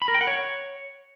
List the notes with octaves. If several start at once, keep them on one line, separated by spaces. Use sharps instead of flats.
B5
A#4
G5
F#5
C#5